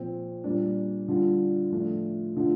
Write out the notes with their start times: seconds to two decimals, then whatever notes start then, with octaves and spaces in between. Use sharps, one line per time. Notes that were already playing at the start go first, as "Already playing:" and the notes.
Already playing: A#2 F3 C4
0.44 A#2 G3 A#3 D4
1.08 D3 G3 D4 F4
1.72 A2 F3 A3 D4 F4
2.36 D3 A3 D4 F4